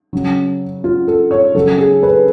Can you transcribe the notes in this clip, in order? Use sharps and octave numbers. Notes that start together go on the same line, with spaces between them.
C#3 F#3
F4
A4
C#5
C#3 F#3 A4
G#4
B4